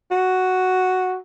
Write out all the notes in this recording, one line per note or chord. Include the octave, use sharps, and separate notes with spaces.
F#4